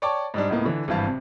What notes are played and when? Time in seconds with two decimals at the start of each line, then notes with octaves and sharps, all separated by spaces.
0.02 C#5 D5 G5 A5 C#6 D6
0.34 G#2 G3 D4
0.50 C#2 A2 A#3 B3
0.65 D3 E3
0.88 G#1 G2 E3 F5 A5
1.07 C3